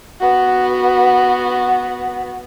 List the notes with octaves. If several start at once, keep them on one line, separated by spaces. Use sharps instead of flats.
B3 F#4